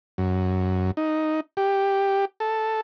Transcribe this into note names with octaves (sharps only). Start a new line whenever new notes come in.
F#2
D#4
G4
A4